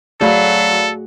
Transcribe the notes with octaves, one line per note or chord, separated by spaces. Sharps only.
F#3 A3 F#4 G#4 A4 D5 F5 B5